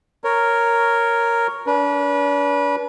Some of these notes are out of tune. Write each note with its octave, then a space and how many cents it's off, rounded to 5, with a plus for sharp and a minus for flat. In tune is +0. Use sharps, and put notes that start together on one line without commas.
A#4 -5 C#5 +0
D4 -40 B4 -30